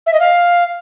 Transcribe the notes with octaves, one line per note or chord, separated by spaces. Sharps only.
E5
D#5
F5